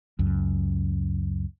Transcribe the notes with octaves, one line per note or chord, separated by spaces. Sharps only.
C#2 F#2